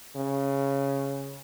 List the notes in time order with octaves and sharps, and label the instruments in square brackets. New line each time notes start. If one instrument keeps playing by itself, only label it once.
[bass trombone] C#3